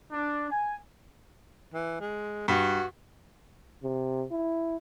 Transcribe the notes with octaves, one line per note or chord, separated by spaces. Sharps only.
D4
G#5
E3
G#3
G2 F#4
C3
E4